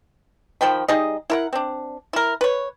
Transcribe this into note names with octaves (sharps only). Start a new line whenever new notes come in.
D#3 F3 G5 B5
G3 D#4 G#4 D#5
E4 A#4 F#5
C4 D4
E4 A#4
B4 C#5